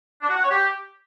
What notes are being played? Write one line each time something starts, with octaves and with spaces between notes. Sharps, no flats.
D4
F#4
F#5
C#5
G4